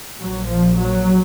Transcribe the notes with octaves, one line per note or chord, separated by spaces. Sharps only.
A#1 A#2 F#3
F3
F#3